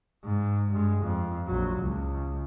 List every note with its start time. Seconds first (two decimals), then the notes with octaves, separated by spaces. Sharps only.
0.24 G#2
0.72 G2 G#3
1.02 F2
1.47 A#1 F#3
1.81 C#2